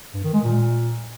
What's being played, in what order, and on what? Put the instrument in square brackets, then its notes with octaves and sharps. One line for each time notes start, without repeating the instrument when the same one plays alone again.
[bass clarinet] G2
D#3
G#3
A#2